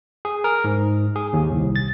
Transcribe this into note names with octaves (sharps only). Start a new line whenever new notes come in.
G#4
A#4
G#2
G#4
D#2
C2
A6